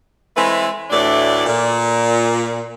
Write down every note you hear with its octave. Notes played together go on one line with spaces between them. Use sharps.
E3 G#3 A3 C4 B4
D2 A2 E3 A3 D4 D5
A#2